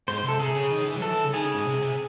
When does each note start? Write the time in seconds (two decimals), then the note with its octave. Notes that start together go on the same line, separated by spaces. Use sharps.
0.08 G#2 C5
0.18 C5
0.23 C3 A4
0.39 C3 G#4
0.55 C#3
0.71 D#3
0.86 E3
0.98 F#3
1.02 E3 A4
1.24 C#3
1.34 D#3 G#4
1.45 C#3
1.54 G#2
1.66 C3
1.81 C3